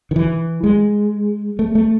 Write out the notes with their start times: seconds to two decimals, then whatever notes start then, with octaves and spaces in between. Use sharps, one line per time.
0.11 D#3
0.16 E3
0.64 G#3
1.59 A3
1.75 A3